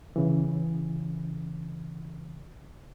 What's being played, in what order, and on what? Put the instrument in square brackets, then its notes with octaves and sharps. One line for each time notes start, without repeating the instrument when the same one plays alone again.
[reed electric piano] C#3 E3